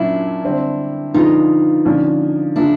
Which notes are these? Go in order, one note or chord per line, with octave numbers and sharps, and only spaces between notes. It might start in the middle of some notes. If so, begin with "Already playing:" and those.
Already playing: A#2 F#3 A#3 C#4 D4 E4
D3 G3 C4
D3 F3 G#3 B3 D#4 F4
D3 F3 A#3 C#4
C#3 F3 A#3 D4 E4